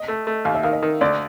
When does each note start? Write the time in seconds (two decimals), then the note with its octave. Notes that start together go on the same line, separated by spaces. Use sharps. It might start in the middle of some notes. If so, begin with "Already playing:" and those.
Already playing: D#5
0.08 A3
0.27 A3
0.45 D#2 F5
0.55 E5
0.63 D#3 F5
0.73 D#5
0.82 D#3
1.01 D2 D5